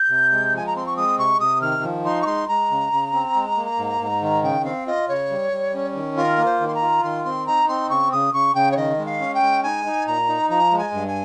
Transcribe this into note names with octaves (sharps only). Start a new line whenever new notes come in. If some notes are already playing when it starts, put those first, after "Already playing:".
Already playing: G6
C3
G#3
F3 G#5
A#5
C4 C6
C#6
G#3 D#6
C3 C#6
C3 D#6
D#3 F6
F3
D#4 C6
C#6
G#3 C6
G#3 A#5
C#3
C#3
C4
G#3
A#3
G#2
G#2
D#3
C#3 G5
C4 F5
F4 D#5
C#3 C#5
G3
G3
C#4
D#3
F4 A#4
A#3
C5
D#3
C6
A#5
F4
D#3 C6
C4 C6
D#4 A#5
C4 C6
C#3 C#6
C#3 D#6
C#3 C#6
C#3 G5
C#5
D#3 D#5
G#3
F5
C#4
G5
G#3
D#4 G#5
D#4
A#2 A#5
D#4
F3 A#5
G#3
G#5
G2
G#5